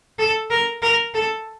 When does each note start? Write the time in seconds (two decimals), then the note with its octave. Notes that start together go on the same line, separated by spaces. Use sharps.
0.18 A4
0.50 A#4
0.82 A#4
1.14 A4